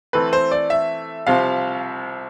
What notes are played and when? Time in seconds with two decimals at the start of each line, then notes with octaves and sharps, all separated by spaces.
0.13 E3 A3 C4 B4
0.33 C5
0.52 D5
0.70 E5
1.27 C2 C3 F3 F5